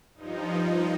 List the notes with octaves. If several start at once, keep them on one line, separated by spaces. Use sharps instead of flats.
G2 F3 D#4